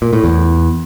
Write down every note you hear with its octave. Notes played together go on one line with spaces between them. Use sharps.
A#2
A2
E2